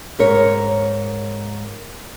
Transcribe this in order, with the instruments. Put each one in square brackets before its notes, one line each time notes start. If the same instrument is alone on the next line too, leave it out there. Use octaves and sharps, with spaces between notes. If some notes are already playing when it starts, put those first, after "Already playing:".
[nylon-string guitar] G#2 A#4 C#5